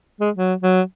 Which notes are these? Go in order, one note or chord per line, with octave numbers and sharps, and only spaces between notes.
G#3
F#3
F#3